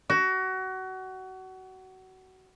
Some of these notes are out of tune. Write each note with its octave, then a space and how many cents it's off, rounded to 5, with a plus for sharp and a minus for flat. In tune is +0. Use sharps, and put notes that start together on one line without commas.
F#4 +25